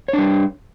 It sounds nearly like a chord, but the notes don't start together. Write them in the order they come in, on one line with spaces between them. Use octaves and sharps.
C#5 D4 G3